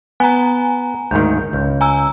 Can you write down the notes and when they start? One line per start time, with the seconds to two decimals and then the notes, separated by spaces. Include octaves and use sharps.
0.20 B3 G#5 A#5
1.11 D2 G#2 D#3 G6
1.53 C#2
1.81 G#5 A#5 E6